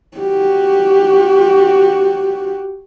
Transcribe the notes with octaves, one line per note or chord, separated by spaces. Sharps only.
F#4 G4